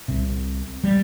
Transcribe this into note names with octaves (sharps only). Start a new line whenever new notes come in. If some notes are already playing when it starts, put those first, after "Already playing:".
C2 C3
G3